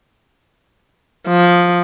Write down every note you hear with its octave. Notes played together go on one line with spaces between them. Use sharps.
F3